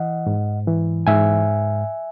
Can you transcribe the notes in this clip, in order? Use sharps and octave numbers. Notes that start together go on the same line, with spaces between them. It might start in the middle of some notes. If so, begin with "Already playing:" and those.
Already playing: E3 D#5 F#5
G#2
E3
G#2 E5 G#5